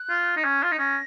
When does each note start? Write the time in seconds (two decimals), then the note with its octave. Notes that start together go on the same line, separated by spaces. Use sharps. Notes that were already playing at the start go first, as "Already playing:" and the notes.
Already playing: F#6
0.10 F4
0.37 D#4
0.44 C#4
0.63 F4
0.72 D#4
0.79 C#4 A#6